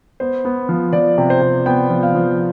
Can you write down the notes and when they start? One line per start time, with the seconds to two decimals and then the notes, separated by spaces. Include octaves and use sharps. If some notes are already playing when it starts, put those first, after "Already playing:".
0.20 B3 C5
0.45 B3
0.69 F3
0.93 F3 D5
1.18 C3
1.30 C5
1.41 C3
1.66 B3 G5
1.90 F3
2.03 F5
2.14 F3